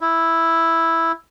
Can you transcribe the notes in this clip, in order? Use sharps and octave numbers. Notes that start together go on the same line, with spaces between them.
E4